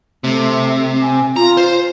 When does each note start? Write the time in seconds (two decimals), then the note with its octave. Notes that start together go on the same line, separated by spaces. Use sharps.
0.24 C3 A3
1.01 G#5
1.36 F4 A#5
1.57 C5